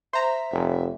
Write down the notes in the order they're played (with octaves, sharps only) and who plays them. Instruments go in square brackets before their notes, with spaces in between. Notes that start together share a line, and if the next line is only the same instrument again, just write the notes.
[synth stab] C5 A#5 [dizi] E5
[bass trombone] F1